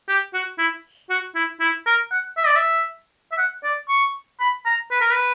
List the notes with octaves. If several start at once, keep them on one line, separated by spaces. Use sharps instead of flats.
G4
F#4
E4
F#4
E4
E4
A#4
F#5
E5
D5
E5
E5
F#5
D5
C#6
B5
A#5
B4
A#4
B4